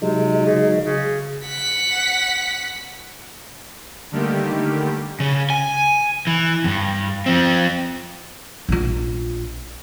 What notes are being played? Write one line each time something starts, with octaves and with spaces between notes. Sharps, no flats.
C3 F#3 G#3 D#4
C#3
C#3
F#5 B6
D3 D#3 G3 A3 A#3 G4
C#3
G#5
E3
E2 G2
F3 C4
A#1 F4